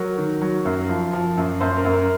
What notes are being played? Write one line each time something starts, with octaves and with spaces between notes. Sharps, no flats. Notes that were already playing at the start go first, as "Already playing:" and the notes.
Already playing: F#3 A#4
D#3
F#3
F#2
F3
F3
F#2
F#2 C5
A#4
F#2
A#4